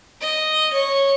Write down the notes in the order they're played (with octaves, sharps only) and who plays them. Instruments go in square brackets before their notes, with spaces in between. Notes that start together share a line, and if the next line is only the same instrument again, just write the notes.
[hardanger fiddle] D#5
C#5